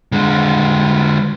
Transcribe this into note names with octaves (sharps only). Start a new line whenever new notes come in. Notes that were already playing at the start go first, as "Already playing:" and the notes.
D3 G#3